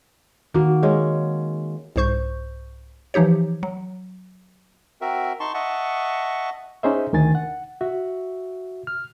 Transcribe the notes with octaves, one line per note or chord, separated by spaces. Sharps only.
D#3 A#3 F#4
G#3 C#4
C2 G#2 C5 C#6 G6
E3 F3 D#4 G4 C#5
F#3
C4 F#4 A#4 E5
D#4 A5 C6 C#6
D#5 E5 F#5 A5 C#6
C#4 D#4 G#4 C5 D#5 E5
D2 D#3 G#5 A6
F#5
F#4 E5
F6